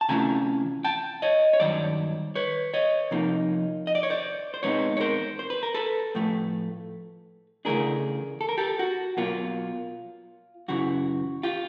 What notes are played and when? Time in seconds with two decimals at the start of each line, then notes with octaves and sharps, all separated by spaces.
0.01 A5
0.09 C3 E3 A3 C#4 F4 G#5 A#5
0.84 G5 A5
1.22 C#5 D#5
1.53 C#5
1.60 G2 D#3 F#3 C5 D5
2.35 B4 C#5
2.74 C#5 D#5
3.11 C3 F3 A#3 D#4
3.87 D#5
3.95 D5
4.03 C#5
4.10 C5 D5
4.54 C5
4.63 E2 B2 G#3 C4 D#4 B4 C#5
4.97 C#5
5.00 A#4 C5
5.39 C5
5.50 B4
5.63 A#4
5.74 A4 B4
6.15 A2 F3 A3
7.65 C#3 E3 A3 D4 G#4 A#4
8.41 A4
8.49 A#4
8.58 G4 A4
8.79 F#4
9.17 B2 F#3 A#3 F4
10.68 F#2 C#3 E3 F#4
11.43 F4 G4